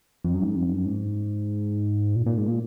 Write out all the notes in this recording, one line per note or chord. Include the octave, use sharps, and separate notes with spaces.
F2
F#2
G#2
F2
F#2
G#2
A#2
A#2
G#2
A#2